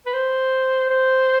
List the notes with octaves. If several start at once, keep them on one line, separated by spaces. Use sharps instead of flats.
B4
C5
C5